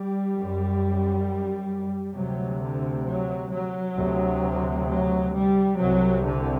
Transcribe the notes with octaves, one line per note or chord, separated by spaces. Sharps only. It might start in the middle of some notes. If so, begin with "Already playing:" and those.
Already playing: G3
F#2
D2 C3 F#3
D3
F#3
F#3
D2 C3
F#3
G3
C2 C3 F#3
D3